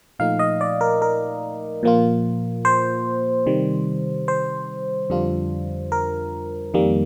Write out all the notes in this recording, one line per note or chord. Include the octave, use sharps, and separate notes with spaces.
A#2 F3 A3 D#4 F5
D#5
D5
A#4
A#4
A#2 F3 A#3 F4
C5
C3 D#3 G3
C5
F2 D3 G3 D4 F4
A#4
F2 D#3 G3 A#3